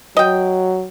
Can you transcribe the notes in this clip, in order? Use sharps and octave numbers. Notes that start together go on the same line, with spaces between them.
F#3 D#5 G5